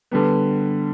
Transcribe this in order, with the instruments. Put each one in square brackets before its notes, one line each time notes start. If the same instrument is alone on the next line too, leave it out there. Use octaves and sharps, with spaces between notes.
[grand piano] D3 G3 B3